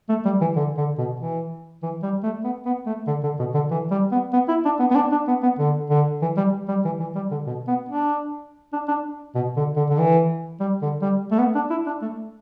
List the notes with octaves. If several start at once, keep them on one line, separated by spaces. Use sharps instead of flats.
A3
G3
E3
D3
D3
B2
E3
E3
G3
A3
B3
B3
A3
D3
D3
B2
D3
E3
G3
B3
B3
E4
D4
B3
B3
D4
D4
B3
B3
D3
D3
E3
G3
G3
E3
E3
G3
D3
B2
B3
D4
D4
D4
B2
D3
D3
D3
E3
G3
D3
G3
A3
B3
D4
E4
D4
A3